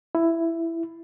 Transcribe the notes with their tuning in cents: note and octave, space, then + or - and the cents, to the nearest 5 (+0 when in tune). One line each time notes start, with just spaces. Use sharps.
E4 +10